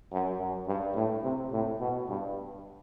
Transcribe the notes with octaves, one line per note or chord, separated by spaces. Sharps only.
F#2
F#2
G2
A2
C3
A2
B2
G2